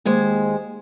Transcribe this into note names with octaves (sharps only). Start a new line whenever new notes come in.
D#2 G#3 C5